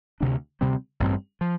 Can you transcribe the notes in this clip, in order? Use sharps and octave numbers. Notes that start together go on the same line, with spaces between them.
D2 C3 G3 D4
D2 C3 G3 C4
A1 G2 G3 C4
F3